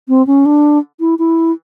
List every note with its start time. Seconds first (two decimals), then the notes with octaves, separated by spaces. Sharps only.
0.08 C4
0.27 C#4
0.45 D4
1.00 E4
1.19 E4